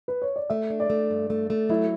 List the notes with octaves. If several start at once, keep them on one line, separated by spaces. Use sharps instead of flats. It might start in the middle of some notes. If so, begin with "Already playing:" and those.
B4
C#5
D5
A3 E5
D4
D5
A3
G2
A3
A3
F#3 E4